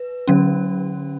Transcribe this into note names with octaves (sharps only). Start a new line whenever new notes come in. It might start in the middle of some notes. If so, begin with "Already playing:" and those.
Already playing: B4
D3 F#3 C#4